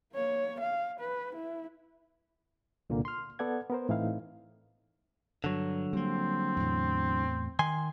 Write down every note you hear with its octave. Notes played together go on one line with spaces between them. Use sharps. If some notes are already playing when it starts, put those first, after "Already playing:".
A#3 C#5
F5
B4
E4
C2 A#2 D3 A#3
C6 F6
B3 A4 D5 F#5 G#6
B3 A#4 C5
A2 E3 C4 D#4 E4 F5
G2 D3 F#3
G3 A#3 C4
E2 A2
D#3 G#5 C6